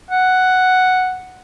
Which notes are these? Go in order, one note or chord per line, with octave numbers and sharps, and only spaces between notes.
F#5